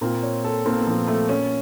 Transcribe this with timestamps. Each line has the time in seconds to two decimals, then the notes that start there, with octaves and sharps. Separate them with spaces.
0.01 A#2 A#3 C4
0.23 C#5
0.45 A4
0.66 A#3 C4
0.77 B3
0.87 A#2 F3 A#3
1.08 A3
1.29 C#4